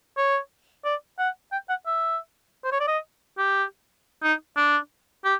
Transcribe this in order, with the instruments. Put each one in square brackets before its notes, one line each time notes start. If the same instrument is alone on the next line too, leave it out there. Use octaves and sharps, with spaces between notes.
[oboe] C#5
D5
F#5
G5
F#5
E5
C5
C#5
D5
D#5
G4
D#4
D4
G4